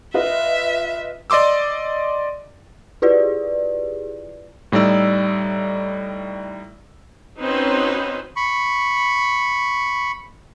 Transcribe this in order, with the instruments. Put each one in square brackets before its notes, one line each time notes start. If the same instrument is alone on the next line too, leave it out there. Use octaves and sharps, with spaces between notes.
[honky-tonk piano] F4 B4 D#5 [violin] E5
[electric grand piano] D5 D#5 C6 D6 E6
[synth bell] E4 F4 G4 G#4 B4 D5
[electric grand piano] A2 G3 D#4 D5 E6
[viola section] C4 C#4 D#4 F#4 B4 C5
[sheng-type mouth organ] B5 C#6